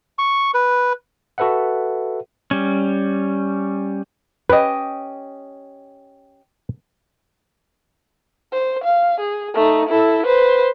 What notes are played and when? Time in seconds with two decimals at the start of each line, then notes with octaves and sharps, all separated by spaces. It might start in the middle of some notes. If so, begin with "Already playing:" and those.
0.18 C#6
0.54 B4
1.38 F#4 A4 B4 E5 F#5
2.51 G3 C#4
4.50 C#4 G4 B4 D#5
8.53 C5
8.84 F5
9.19 G#4
9.54 A3 D#4
9.89 E4 A4
10.26 B4 C5